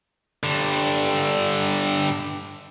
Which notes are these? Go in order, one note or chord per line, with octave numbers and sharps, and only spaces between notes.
G2 D3